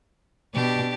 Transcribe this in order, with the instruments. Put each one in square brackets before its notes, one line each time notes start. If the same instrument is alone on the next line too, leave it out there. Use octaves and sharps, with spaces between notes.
[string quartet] B2 [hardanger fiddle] D4 G4